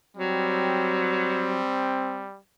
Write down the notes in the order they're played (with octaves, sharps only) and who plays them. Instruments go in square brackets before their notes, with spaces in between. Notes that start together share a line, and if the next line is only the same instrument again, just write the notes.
[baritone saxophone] F#3 [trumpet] G3 [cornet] C4